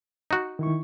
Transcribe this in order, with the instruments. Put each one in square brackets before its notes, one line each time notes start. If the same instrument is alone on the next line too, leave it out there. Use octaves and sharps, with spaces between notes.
[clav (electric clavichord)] D#4 F#4
[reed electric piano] D#3 E4 C#6